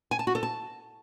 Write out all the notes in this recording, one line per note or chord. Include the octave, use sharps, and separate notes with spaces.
G#5
A5
F#4
A4
A5